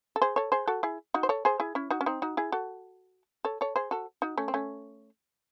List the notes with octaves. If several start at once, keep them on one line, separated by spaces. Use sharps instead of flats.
A4
G#4 C5
A4 C#5
G#4 C5
F#4 A4
E4 G#4
D#4 F#4
C5
A4 C#5
G#4 C5
E4 G#4
C#4 E4
D#4 F#4
C#4
C4 D#4
D#4 F#4
E4 G#4
F#4 A4
A4 C#5
A4 C#5
G#4 C5
F#4 A4
D#4 F#4
A3 C#4
C4
A3 C#4